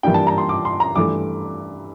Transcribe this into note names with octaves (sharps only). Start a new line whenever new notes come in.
G2 E3 G3 A#3 D4 G5
A5
A#5
C6
D6
C6
A#5
G2 E3 A3 D6